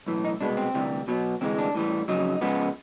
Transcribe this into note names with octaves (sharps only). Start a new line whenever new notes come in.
B1 A2 E3
D#4
C2 B2 G#3 B3 D4
C4
D2 C3 E3 G3
B1 B2 F#3 B3
D2 C3 E3 G#3 C4
D4
A2 E3 G3
F2 C#3 F#3 D#4
C#2 C#3 F3 G#3 B3